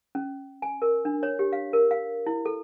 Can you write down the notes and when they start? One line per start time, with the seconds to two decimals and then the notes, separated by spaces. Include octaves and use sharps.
0.15 C#4
0.62 G#5
0.82 A#4
1.05 D4
1.23 C#5
1.39 G4
1.53 F5
1.73 A#4
1.91 F5
2.26 E4
2.45 A4